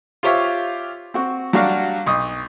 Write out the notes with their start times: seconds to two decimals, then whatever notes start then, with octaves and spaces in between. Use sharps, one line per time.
0.23 F4 G4 C5 C#5 E5 F5
1.14 C4 F#4 C#6
1.53 F#3 G3 D4 F#4 D5 F5
2.07 B1 C#6 D#6